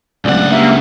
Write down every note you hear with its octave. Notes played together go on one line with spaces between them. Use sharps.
D1 C#2 D5 F#5
G2 A#3 E5